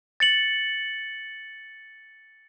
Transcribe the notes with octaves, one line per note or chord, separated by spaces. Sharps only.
A6 C#7 F#7